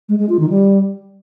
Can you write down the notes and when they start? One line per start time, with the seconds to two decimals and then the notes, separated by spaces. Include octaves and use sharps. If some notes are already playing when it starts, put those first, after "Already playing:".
0.09 G#3
0.19 G#3
0.29 F4
0.39 D#3
0.50 G3